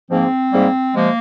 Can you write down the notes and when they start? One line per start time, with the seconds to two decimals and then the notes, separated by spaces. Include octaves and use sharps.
0.10 G#2 F3 A#3 C4
0.52 G#2 G3 A#3
0.95 C3 F3 G#3 A#3